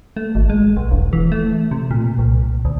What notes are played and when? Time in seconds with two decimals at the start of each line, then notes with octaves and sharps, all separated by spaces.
0.17 A3
0.35 G#1
0.50 G#3
0.77 B1
0.91 E1
1.13 E3
1.32 A3
1.71 C3
1.91 A#2
2.19 C2
2.65 D2